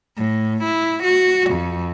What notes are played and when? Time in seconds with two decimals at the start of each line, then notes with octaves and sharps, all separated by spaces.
0.17 A2
0.64 E4
1.03 F#4
1.51 F2